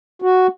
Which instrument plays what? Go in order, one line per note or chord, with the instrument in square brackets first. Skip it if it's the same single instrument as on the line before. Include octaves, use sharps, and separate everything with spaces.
[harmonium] F#4